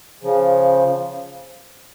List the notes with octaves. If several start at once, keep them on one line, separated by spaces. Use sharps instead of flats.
C#3 F3